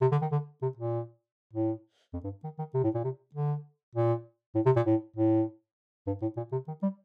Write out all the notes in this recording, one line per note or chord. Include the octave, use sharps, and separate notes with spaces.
C3
D3
D#3
D3
C3
A#2
A2
F2
G2
D#3
D#3
C3
A2
A#2
C3
D3
A#2
A2
C3
A#2
A2
A2
G2
A2
A#2
C3
D#3
G3